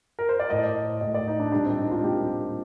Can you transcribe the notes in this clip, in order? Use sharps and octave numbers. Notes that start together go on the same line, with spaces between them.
A#4
C5
D5
A2 A3 D#5
A2 A3 D#5
D5
D#4
D4
A#2 G3 A#3 D4
C4
D#4
F4
A#2 G3 A#3 G4